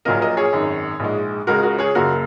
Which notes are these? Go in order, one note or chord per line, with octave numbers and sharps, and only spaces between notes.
A#1 A#2 F#3 A#3 A#4 D#5
A#4 D#5
G#4 C#5
G#1 F#2 D#3
A#1 G#2 G#3
C#2 C#3 G#3 F#4 A#4
F#4 A#4
G#4 C#5
F#1 F#2 C#3 A#3 F#4 A#4